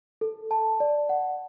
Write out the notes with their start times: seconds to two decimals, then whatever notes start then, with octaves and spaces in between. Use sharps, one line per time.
0.21 A4
0.51 A5
0.80 D5
1.09 F#5